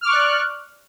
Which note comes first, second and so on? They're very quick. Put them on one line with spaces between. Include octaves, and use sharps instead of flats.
F6 D6 C#6 F#6 D5